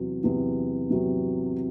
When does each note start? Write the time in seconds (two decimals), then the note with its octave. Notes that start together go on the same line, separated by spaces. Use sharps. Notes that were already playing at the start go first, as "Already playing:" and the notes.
Already playing: E2 C3 F#3
0.24 E2 C3 F#3
0.90 E2 C3 F#3